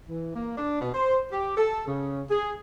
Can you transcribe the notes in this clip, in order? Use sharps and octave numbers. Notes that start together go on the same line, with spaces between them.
E3
A#3
D4
B2
C5
G4
A4
C#3
G#4